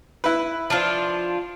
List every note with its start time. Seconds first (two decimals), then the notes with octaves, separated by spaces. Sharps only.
0.24 E4 B4
0.70 F3 D4 F4